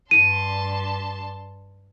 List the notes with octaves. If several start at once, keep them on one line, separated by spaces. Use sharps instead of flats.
G2 A5 C6 D#7